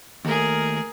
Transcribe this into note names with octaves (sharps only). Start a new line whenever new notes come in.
D#2 A3 G#4 A#4